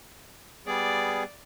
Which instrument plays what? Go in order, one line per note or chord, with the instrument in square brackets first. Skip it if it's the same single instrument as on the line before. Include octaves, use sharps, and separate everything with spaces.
[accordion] G3 B3 G#4 [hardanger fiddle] D5